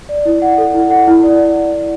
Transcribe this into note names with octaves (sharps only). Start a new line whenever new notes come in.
D5
E4
F#5
A4
E4
F#5
E4
D5
E4